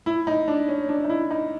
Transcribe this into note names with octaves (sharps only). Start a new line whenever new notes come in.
E4
D#4
D4
C#4
D4
D#4
E4
D#4